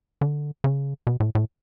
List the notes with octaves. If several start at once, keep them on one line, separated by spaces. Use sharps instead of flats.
D3
C#3
B2
A2
A2